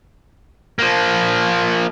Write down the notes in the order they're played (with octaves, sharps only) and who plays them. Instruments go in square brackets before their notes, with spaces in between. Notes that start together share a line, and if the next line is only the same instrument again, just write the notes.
[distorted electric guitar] F3 A#3